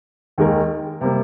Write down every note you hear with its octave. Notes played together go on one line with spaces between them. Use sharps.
D#2 D#3 G#3 D#4 A#4
C3 G3 A#3